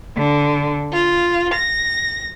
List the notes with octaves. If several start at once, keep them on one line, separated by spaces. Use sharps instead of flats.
D3
F4
A#6